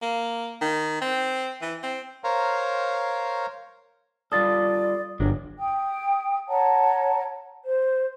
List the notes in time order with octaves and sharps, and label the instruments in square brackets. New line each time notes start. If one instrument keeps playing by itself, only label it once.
[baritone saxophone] A#3
D#3
C4
E3
C4
[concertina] A#4 C5 C#5 F5 A#5
[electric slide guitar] G3 F4 A4 [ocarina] D5 [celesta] D#6 A6
[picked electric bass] G1 [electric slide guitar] F#3 D4
[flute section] G5 D#6
C#5 F#5 A5 A#5
C5